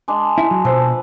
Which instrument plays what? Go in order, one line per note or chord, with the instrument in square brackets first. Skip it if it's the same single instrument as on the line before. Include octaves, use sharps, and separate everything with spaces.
[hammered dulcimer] G#3 D4
[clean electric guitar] E4
F#3
[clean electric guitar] B2 C5 [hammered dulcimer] F3 A4 B4